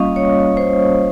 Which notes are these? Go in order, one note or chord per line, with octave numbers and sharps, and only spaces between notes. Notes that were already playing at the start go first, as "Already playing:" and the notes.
Already playing: G3 A#3 C#4 F4 D#5 F5 C#6 D#6
C#5
C5